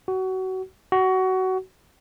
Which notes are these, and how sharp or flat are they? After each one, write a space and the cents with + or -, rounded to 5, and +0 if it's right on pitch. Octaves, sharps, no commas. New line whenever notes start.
F#4 +25
F#4 +20